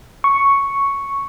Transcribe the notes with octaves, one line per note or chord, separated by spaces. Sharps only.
C#6